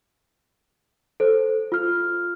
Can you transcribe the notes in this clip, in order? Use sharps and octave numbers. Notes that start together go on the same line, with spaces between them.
A4 C5
F4 F6